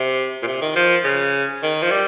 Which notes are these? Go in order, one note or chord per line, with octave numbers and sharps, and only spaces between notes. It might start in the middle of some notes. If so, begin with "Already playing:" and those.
Already playing: C3
A#2
C3
D#3
F3
C#3
D#3
F3
G3